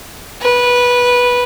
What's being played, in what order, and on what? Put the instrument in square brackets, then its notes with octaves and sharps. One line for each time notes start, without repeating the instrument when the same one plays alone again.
[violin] B4